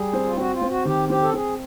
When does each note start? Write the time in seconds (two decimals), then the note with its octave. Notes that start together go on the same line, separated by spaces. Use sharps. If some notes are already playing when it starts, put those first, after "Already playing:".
Already playing: G3 G#4
0.13 C4
0.25 F4
0.37 C4 F#4
0.53 F4
0.61 C4
0.69 F#4
0.85 D#3 G4
1.09 C4 G4
1.22 A4
1.33 C4 G#4